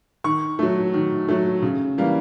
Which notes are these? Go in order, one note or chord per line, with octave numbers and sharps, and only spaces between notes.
D#3 C#6
F#3 A3
D#3
F#3 A3
C#3
E3 G3 A#3